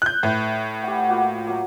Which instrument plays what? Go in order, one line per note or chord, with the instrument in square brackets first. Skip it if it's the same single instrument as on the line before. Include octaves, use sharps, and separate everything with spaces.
[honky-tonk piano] F#6 G6
[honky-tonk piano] A2 [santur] B4
[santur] G4 F#5
A#3 F4 F#4
F#3 A#3